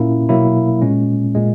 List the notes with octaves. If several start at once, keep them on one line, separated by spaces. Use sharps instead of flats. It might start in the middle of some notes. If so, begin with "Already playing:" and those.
Already playing: A#2 A#3 C#4 E4
B2 F#3 A#3 E4
A#2 G#3 C#4
A#2 G#3